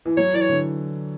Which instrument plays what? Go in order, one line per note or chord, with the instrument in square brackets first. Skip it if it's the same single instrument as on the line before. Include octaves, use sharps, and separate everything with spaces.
[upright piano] E3
[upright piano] F#3 [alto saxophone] C#5
[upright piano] E3 [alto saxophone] D5
[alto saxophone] C#5
[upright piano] D3